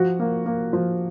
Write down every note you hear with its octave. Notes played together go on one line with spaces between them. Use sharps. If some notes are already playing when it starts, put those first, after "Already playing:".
Already playing: F3 F#4
A#3
A#3
F3